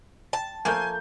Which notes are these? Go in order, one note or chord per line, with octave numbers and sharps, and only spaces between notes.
A5
F3 A3 A#3 G#5 G6